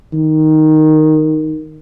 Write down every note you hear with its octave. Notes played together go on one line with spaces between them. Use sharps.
D#3